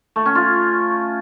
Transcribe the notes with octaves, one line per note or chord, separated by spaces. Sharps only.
A3
C#4
F4